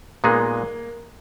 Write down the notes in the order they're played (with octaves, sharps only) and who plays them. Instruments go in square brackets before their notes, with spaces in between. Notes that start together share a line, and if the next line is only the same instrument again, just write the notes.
[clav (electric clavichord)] A#2 G#3 B3 D#4 G#4 [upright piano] A#3